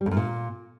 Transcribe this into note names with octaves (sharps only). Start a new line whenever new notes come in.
G3
F2
F#2
A#2